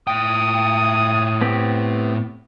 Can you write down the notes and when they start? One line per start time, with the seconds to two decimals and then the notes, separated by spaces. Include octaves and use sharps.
0.07 A2 G5 D#6
1.41 B3 C4 G4